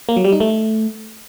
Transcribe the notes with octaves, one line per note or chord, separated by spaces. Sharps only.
A#3
F#3
G3
D#4
A3